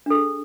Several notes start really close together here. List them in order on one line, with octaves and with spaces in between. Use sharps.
D4 A4 G#4